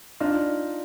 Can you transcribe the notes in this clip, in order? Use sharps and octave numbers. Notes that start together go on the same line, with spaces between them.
D4 D#4 F4